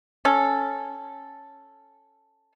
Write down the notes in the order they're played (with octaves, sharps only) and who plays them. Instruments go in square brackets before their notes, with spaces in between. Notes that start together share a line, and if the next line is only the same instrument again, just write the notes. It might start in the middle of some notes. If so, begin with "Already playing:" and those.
[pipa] C#4 A4